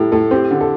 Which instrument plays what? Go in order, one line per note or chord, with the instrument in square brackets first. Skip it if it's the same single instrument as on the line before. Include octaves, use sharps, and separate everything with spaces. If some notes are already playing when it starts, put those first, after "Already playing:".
Already playing: [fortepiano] A2 G3 [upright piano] G4 A4
[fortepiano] A2 [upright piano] A4
[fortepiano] C4 [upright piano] G4
[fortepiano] D3
[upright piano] A4